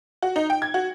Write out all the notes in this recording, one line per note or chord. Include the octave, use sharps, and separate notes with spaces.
F#4
D#4
G5
G#6
F#4